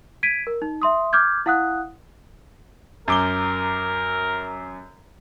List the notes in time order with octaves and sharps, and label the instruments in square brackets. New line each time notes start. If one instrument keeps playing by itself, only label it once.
[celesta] G#6 B6 D7 D#7
A#4
D#4
E5 C6 D#6
D6 F6 G6 G#6
E4 F5 F#5 D#6 F#6
[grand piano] F#2 D6 G7 [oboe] A#4